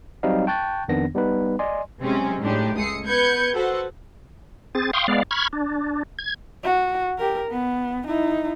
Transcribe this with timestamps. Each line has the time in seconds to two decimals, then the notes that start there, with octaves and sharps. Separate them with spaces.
0.23 F#3 G3 C4 D#4 D#5 F5
0.47 G5 A5 C#6 F#6 G6 A6
0.88 F2 D#3 B3 D4 A#6
1.15 G3 B3 D#4 B4
1.59 D5 D#5 G#5 C6
2.00 C3 F#3 G#3 C4 C#4
2.41 A2 G#3 D4 D#4 G4
2.76 C#2 G#3 A3 D#6 C7 C#7
3.05 B3 B4 G6 G#6 C#7
3.54 F#4 A4 B4 C5 F#5
4.75 C4 G#4 A6
4.93 F5 G5 C6 C#6 D#6
5.08 G#3 B3 D5 F5
5.31 B5 C#6 F6 G#6
5.53 D4
6.19 G#6
6.63 F#4
7.18 G4 A#4
7.51 B3
8.07 D#4 E4